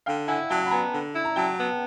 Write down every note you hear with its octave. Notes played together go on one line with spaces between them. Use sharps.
D3 F5 G5
E4 F#5 G#5
F#3 G5 A5
B5
B3 G#5 A#5
D3
E4
A#5
F#3 G5 A5
B3